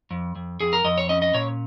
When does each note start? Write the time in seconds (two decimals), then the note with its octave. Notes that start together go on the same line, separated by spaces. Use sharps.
0.11 F2
0.35 F2
0.60 F2 G#4
0.73 A#4
0.84 F2 D#5
0.98 C#5
1.09 C#4 D#5
1.22 D#5
1.34 A#2 C#5